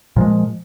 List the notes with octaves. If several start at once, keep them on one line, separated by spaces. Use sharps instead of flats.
A#2 F3 G#3